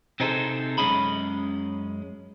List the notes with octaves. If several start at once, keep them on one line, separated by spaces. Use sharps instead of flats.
C3 C4 D#4 G#4 A4 C5
F#2 G#3 C#4 D#5 B5